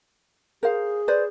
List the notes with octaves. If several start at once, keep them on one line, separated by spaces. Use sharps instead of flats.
G#4 A#4 C5 F5
B4 C5 D5